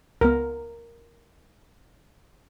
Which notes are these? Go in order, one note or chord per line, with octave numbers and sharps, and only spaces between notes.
C#2 B3 A#4